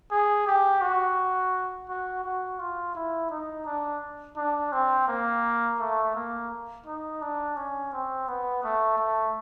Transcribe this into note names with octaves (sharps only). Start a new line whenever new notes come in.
G#4
G4
F#4
F#4
F#4
F4
E4
D#4
D4
D4
C4
A#3
A3
A#3
D#4
D4
C#4
C4
B3
A3
A3